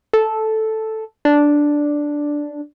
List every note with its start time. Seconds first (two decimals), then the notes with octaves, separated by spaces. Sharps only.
0.13 A4
1.25 D4